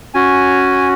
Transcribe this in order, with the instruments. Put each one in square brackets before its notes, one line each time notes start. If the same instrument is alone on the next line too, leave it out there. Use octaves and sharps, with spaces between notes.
[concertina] C#4 F#4 G#5